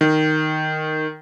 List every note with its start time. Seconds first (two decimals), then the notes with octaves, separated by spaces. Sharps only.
0.01 D#3